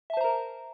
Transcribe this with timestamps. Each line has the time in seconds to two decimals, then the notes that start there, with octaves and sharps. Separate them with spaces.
0.10 E5
0.13 A5
0.17 C5
0.21 A#5
0.24 A#4